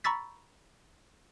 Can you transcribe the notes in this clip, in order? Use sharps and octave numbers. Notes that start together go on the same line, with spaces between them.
A#5 B5 C#6 E6 A6 B6